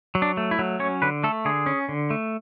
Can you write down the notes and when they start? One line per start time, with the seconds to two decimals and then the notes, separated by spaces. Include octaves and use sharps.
0.15 F#3
0.22 D4
0.37 A3
0.51 E4
0.59 F#3
0.80 C#4 C#5
1.02 D3 B4
1.24 A3 A4
1.45 D3 G#4
1.66 C#4
1.89 D3
2.10 A3